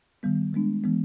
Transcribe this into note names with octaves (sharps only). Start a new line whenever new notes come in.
D#3 G3 B3
D#3 G#3 B3 D4
E3 G#3 B3